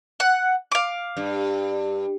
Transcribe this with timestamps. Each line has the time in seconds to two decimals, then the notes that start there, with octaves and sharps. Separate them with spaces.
0.20 F#5
0.72 F5 D6
1.17 G2